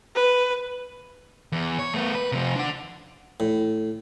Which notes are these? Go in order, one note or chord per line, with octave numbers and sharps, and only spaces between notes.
B4
E2
C#5
A3 B3
B4
C3 F3
D4 F#5
A2